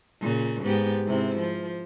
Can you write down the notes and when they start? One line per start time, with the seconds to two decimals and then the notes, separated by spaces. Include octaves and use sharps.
0.21 A#2 C#3
0.63 G#2 B3 G4
1.06 G#2 C3 E4
1.38 F3